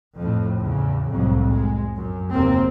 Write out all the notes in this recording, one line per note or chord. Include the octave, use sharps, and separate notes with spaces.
F2 A2
A1 E2 C#3
C2 F2 A2 F#3
G#3
F#2
F1 D#2 A#3 C4